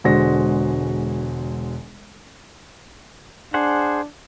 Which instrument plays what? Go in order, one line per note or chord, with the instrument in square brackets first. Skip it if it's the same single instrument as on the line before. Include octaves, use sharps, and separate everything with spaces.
[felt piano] E1 D3 G#3 F#4 C5 A#6
[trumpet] D4 [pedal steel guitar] G#4 C5 F#5